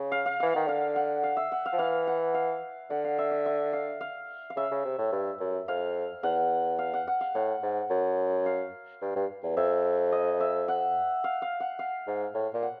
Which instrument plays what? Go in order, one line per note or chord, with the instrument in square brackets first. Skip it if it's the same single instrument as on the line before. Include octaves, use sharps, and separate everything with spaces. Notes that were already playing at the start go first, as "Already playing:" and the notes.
Already playing: [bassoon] C#3
[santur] F5
F5
[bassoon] E3 [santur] F5
[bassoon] D#3 [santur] F#5
[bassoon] D3 [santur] F5
[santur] F#5
F5
E5
F#5
F5
[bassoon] F3
[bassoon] E3 [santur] F5
[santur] F#5
F5
[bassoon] D3 [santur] F#5
[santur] F5
E5
E5
E5
F5
F5
F5
[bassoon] C#3 [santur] E5
[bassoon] C#3
C3
A2
G2
F#2
[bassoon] F2 [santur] F5
[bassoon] E2 [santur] F#5
[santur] F5
F#5
F#5
F5
[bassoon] A2 [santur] F#5
[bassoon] G#2
F#2
[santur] F5
[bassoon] G2
G2
E2
[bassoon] F2 [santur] E5
[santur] D#5
E5
F#5
F5
F5
F#5
F5
[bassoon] G#2
A2
A#2
[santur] F#5